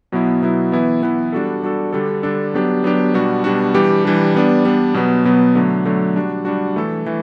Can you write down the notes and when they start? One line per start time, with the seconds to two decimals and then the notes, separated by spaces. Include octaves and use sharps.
0.12 B2 F#3 B3 E4
0.42 B2 F#3 B3 E4
0.72 E3 B3 E4
1.03 E3 B3 E4
1.32 G3 D4 F#4 A4
1.63 G3 D4 F#4 A4
1.93 D3 G3 D4 A4
2.23 D3 G3 D4 A4
2.54 F#3 B3 D4 G4
2.84 F#3 B3 D4 G4
3.14 B2 G3 D4 F#4
3.44 B2 G3 D4 F#4
3.74 E3 G3 D4 G4
4.05 E3 G3 D4 G4
4.35 G3 B3 D4
4.65 G3 B3 D4
4.94 B2 F#3 B3
5.25 B2 F#3 B3
5.55 D3 F#3 A3
5.86 D3 F#3 A3
6.15 G3 D4 F#4
6.45 G3 D4 F#4
6.76 E3 A3 E4 A4
7.06 E3 A3